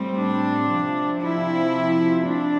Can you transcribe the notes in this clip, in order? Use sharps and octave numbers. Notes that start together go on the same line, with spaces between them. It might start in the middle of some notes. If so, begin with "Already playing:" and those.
Already playing: A2 G3 C4
D4
C3 F3 C4
E4
D4